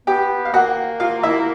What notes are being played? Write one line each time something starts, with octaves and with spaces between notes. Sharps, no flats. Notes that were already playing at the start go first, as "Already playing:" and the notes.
B3 G4 G5
F5
A#3 F#4 F#5
F4 F5
E4 E5